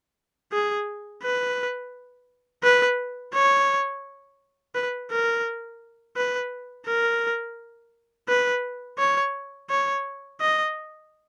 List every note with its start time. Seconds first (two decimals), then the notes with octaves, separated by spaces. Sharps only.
0.53 G#4
1.23 B4
2.64 B4
3.34 C#5
4.75 B4
5.11 A#4
6.17 B4
6.87 A#4
8.29 B4
8.98 C#5
9.70 C#5
10.40 D#5